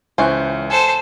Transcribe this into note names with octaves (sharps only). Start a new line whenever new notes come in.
C#2 E3 C#4 C5 F#6
A4 C5 G#5